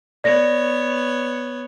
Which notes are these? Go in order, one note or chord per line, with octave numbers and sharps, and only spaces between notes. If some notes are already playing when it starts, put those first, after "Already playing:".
B3 C#5 D5 A#6